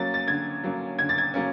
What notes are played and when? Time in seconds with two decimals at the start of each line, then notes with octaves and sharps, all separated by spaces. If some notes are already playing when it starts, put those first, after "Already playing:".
Already playing: F#3 A#3 C#4 A6
0.14 A6
0.28 D3 G#6
0.64 F#3 A#3 C#4
0.99 D3 G#6
1.09 A6
1.18 G#6
1.34 F#3 A#3 C#4